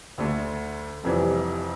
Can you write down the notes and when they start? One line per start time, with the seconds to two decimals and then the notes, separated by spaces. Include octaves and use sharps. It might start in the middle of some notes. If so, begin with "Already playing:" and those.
0.18 D2 D3 A3
1.04 F1 F2 C3 E3 G3